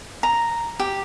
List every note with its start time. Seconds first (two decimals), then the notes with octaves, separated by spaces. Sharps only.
0.23 A#5
0.80 G4